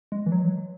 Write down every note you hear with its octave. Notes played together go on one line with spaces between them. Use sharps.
G#3
E3
F#3